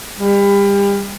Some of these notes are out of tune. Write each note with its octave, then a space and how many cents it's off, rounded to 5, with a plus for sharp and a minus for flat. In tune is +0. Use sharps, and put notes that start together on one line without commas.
G3 +35